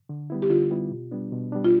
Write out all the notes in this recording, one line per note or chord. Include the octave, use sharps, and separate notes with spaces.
D3
G3 B3 E4
G4
D3 F4
G3 B3 E4
B2
G3 B3 D4
B2
G3 B3 D4
F4